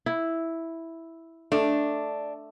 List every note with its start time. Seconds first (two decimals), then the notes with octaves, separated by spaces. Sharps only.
0.06 E4
1.52 A3 D4